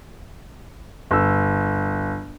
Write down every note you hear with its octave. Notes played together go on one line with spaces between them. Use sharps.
G1 E6